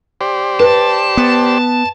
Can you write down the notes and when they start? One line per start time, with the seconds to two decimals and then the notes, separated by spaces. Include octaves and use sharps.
0.21 G4 C5 D5
0.60 B4 A5
1.17 B3